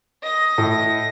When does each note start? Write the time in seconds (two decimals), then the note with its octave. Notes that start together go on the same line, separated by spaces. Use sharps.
0.22 D#5 A#6
0.58 A2